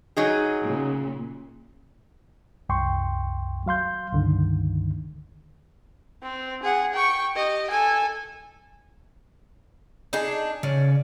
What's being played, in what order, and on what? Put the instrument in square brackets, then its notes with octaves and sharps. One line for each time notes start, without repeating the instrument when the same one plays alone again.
[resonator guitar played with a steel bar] F#3 D#4 G#4
[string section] A#2 C#3
[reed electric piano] C2 F#2 G5 C6 C#6
F#3 F5 C6 G6
C#2 G2 D3 D#3
[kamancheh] C4
G#4 F#5
G5 C#6
G4 D#5
A4 G#5
[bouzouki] D4 D#4 G#4
[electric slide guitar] C#3 D5 [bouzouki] C#4